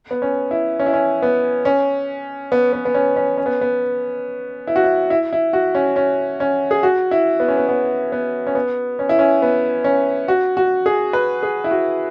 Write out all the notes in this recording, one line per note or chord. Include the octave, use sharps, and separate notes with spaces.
B3
C#4
E4
C#4
E4
C#4
B3
C#4
B3
B3
B3
C#4
C#4
C#4
B3
B3
E4
F#4
E4
E4
E4
F#4
C#4
C#4
C#4
G#4
F#4
E4
B3
C#4
B3
B3
B3
C#4
B3
C#4
E4
C#4
B3
C#4
F#4
F#4
G#4
B4
G#4
E4
F#4